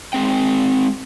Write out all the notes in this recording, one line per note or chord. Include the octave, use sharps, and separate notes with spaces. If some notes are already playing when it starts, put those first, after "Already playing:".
G#3 C4 G5